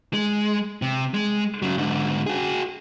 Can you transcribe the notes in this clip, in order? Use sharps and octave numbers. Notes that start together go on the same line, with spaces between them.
G#3
C3
G#3
C#3 F#3
G#2 D3
F#4 G#4